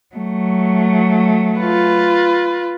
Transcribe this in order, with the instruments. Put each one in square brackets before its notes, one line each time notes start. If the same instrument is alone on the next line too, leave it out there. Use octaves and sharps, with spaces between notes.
[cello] F#3 A3
[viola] F4 B4